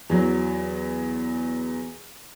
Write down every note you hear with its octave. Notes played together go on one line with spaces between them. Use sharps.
E2 F#3